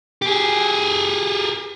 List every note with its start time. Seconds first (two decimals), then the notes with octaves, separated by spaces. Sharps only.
0.22 G4 G#4